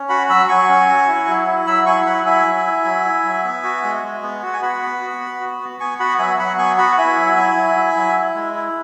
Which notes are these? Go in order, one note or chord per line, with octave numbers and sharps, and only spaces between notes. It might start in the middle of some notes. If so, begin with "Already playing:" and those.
Already playing: C#4
F#4 F#5 B5
F#3 B5 E6
F#3 G#5 C#6
C#4
F#4
E4
F#3
E4
F#3 B5 E6
E4 G#5 C#6
F#3 F#5 B5
E4 E5 G#5
F#3
E4
F#3
E4
F#3
B3
F#4
G#3
G#3
B3
F#4 F#5
G#5
F#4 F#5 B5
B3
F#4
B3
F#4
B3
B3 G#5 C#6
F#4 F#5 B5
F#3 E5 G#5
F#3 F#5 B5
B3 G#5 C#6
F#4 F#5 B5
E4 E5 G#5
F#3
E4
F#3
E4
F#3
E4
G#3
E4